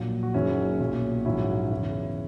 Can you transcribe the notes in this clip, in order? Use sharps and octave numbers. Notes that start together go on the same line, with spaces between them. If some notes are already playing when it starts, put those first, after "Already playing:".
Already playing: A#1 A#2 F#3
F#4
F#1 F#2 D#3 F#3 C#4 E4
B1 A#2 F#3
A#1 G#2 D#3 F#3 C#4 E4
E2 C#3 E3